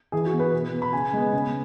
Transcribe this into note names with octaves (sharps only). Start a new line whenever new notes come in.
E3 G#4
F#4
B3
B4
B2
B3
B5
C#3 G#5
G#3 B3
C#3